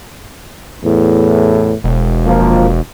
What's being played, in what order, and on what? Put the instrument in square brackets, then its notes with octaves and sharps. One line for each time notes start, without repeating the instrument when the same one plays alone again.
[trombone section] E2 A2
[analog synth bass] E1
[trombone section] F3 A#3